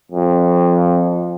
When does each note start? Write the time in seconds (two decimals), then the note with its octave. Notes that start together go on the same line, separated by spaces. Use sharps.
0.11 F2